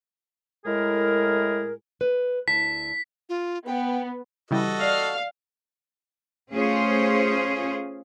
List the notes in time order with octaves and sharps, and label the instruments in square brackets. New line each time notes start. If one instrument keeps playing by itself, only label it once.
[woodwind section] A2 G#3 E4 G#4 A#4
[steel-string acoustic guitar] B4
[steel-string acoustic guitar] D2 E4 A5 [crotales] B6
[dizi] F4
[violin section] B3 [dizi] G5
[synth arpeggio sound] C#3 E3 G3 [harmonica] F#4 A4 D#5
[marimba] D5 [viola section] F5
[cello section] A3 C#4 F4 G#4 C5